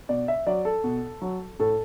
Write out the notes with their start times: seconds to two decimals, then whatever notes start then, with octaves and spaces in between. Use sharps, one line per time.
0.09 B2 D5
0.28 E5
0.47 F#3 D5
0.65 A4
0.84 B2
1.22 F#3
1.60 A2 A4